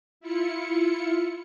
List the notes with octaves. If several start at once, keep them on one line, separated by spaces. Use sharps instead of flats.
E4 F4 C#7